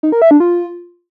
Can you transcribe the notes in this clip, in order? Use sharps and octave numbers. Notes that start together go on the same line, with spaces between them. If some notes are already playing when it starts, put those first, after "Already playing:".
D#4
A#4
E5
D4
F4